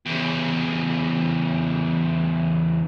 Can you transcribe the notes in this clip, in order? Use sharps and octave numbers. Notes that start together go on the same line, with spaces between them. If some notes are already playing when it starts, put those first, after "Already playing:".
E2 C#3